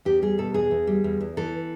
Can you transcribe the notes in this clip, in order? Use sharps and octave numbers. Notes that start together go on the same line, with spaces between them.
E2 G4
G3 G#4
B2 A4
E2 G#4
E2
G3
E2
E2
E3 A4